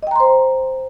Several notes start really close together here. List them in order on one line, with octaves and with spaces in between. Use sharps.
D#5 G5 A#5 C6 C5